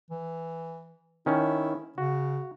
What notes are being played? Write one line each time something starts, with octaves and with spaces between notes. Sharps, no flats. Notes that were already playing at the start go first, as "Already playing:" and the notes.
E3
D#3 C#4 E4
C#3 F#4